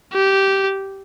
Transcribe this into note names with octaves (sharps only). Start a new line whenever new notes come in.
G4